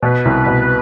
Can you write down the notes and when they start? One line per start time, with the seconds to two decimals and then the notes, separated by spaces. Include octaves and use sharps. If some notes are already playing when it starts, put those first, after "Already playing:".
0.02 B2 B4
0.25 C2
0.46 B2